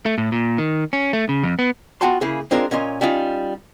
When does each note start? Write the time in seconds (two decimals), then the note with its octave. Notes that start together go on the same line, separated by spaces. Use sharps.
0.06 A3
0.18 A2
0.32 A#2
0.58 D#3
0.93 C#4
1.13 A3
1.29 C#3
1.43 F2
1.59 B3
2.01 B3 F4 F#4 G5 A5 C6
2.21 C#3 A#3 E4 G#4
2.51 G#3 C4 D4 F4 A#4
2.71 A#2 C#4 A#4 D#5 C6
3.01 G3 C#4 D#4 F4